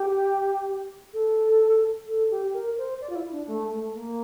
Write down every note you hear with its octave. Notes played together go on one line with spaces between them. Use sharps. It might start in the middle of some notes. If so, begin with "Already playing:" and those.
Already playing: G4
A4
A4
G4
A#4
C5
D5
F4
E4
D4
A3
A3
A#3